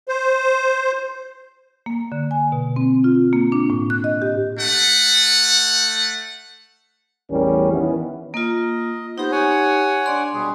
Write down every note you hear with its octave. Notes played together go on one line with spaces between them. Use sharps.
C5
A#3
D3
G#5
B2
C4
F4
A#3
D4
A2
F#6
D#5
G4
A3 F#5
A1 E2 G3 C#4 A#4
D#3 E3 B3 C#4 E4
A#3 F4 D#5
B3 D#4 G4 C5
C#5 F#5 G#5
D4 D5 C6
B2 G3 G#4